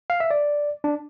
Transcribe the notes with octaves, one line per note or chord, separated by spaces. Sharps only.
F5
E5
D5
D4